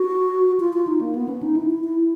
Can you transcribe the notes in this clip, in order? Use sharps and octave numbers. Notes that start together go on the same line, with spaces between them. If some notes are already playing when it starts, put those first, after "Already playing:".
Already playing: F#4
F4
F4
D#4
A#3
B3
C#4
D#4
E4
E4
E4